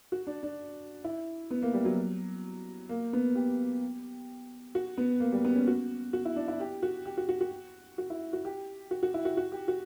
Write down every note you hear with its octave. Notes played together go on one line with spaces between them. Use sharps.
F#4
D4
D4
E4
B3
A#3
G3
F#3
A#3
B3
G4
F#4
B3
A#3
G3
B3
C#4
F#4
F#4
E4
D4
E4
G4
F#4
G4
F#4
F#4
F#4
F#4
E4
F#4
G4
F#4
F#4
E4
F#4
F#4
G4
F#4